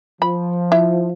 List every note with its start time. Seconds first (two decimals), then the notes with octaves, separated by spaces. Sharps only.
0.22 F3 B5
0.72 E4